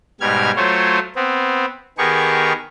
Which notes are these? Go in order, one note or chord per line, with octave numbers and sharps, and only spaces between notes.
G#2 B2 G3 F6 G#6
F#3 A3 F4 C5 C#5
B3 C4
D#3 B3 G4 G#4 A#4 C#6